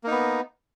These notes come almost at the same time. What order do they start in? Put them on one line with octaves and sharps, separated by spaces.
A#3 D#4 B3